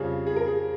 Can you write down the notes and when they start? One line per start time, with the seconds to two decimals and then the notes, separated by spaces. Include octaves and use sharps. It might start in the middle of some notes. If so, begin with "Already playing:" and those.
Already playing: F2 C#3 G3 G#4
0.27 G#4
0.36 A#4
0.47 G#4